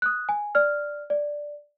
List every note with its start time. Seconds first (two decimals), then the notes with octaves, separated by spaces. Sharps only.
0.02 D#6 F#6
0.29 G#5
0.55 D5 F6
1.10 D5